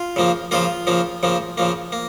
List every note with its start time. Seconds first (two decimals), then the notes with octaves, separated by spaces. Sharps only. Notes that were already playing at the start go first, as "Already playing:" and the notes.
Already playing: F4
0.16 C#3 F3 A#3
0.51 C#3 F3 A#3 F4
0.87 C#3 F3 A#3
1.23 C#3 F3 A#3
1.58 C#3 F3 A#3
1.92 A#3